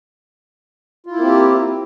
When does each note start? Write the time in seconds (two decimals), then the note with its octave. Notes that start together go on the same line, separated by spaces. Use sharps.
1.06 F4
1.11 E4
1.16 A#3
1.21 C4
1.26 G4